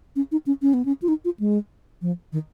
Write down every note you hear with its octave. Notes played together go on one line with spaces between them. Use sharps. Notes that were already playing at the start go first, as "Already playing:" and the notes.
C#4
D#4
C#4
C#4
B3
C#4
F4
D#4
F4
G#3
F3
D#3